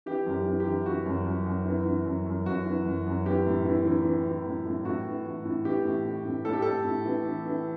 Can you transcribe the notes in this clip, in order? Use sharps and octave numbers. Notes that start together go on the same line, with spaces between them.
E3 G4
F#2
G4
E3
G4
E3
E3 F#4
F#2
F#2
F#2
E3
E3
F#2
F#2
F#2 F#4
E3
F#2
F#2
E3 G4
A2
E3
E3
E3
E3
A2
A2
A2 F#4
E3
A2
A2
E3 G4
A2
A2
A2
A2 A4
G4
A2 A4
A2
E3
E3
E3